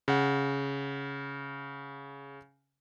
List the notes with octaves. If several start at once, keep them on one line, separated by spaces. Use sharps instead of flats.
C#3 F#5